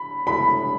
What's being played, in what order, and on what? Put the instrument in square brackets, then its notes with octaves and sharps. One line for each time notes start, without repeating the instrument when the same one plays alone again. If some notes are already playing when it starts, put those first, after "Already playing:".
Already playing: [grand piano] B5
B5